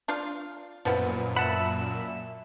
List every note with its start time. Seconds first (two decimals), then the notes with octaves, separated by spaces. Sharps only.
0.08 D4 F4 F5
0.85 F#2 A#2 F3 B3 E4
1.36 E5 F#5 A5 B5